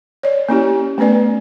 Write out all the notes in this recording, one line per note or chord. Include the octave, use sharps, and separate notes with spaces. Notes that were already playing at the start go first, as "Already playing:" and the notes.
C#5 D5
A#3 C#4 E4 G4
A3 B3 C#4 B4 D5